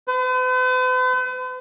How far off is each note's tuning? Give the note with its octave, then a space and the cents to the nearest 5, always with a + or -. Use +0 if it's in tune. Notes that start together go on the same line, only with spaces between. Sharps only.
B4 +45